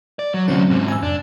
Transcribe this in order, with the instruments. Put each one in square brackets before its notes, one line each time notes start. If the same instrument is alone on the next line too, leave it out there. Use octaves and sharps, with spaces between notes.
[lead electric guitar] D5
F#3
[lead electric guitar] D2 C3 [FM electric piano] F#3 C4 C#4
[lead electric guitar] G#2 C3
[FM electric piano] G#5 E6
[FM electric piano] F2 [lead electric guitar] D4